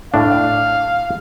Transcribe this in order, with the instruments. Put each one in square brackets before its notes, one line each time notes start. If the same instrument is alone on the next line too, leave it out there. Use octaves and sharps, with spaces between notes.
[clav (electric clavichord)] A2 D4 [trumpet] F5